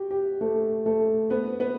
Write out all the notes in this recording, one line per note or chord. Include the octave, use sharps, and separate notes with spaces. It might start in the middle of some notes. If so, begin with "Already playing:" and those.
Already playing: F#4 G4
G4
A3 A4
A3 A4
B3 B4
B3 B4